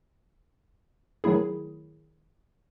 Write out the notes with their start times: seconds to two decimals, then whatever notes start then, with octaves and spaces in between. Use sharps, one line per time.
1.24 D#3 F#3 A3 E4 G#4